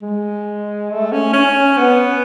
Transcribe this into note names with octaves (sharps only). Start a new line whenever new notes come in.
G#3
A3
C#4
C#4
B3